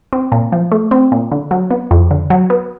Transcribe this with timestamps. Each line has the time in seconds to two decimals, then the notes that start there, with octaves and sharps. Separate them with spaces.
0.13 C4
0.32 A#2
0.52 F3
0.72 A3
0.91 C4
1.12 A#2
1.31 D3
1.51 F#3
1.70 B3
1.91 F2
2.11 D3
2.30 F#3
2.50 B3